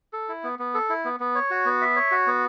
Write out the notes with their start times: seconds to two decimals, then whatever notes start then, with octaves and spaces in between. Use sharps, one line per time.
0.13 A4
0.29 E4
0.44 B3
0.59 B3
0.74 A4
0.89 E4
1.05 B3
1.20 B3
1.35 C#5
1.51 F#4
1.66 B3
1.81 E5
1.96 C#5
2.12 F#4
2.27 B3